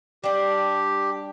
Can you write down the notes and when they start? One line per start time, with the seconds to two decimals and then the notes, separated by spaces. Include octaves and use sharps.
0.24 G3 D4 G4